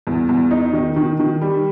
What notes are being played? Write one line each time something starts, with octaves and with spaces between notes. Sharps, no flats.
E2
E2
D#4
D#3
D#3
D#3
G3